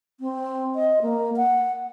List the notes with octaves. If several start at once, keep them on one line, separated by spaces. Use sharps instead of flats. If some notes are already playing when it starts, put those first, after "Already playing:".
C4
D#5
A#3
F#5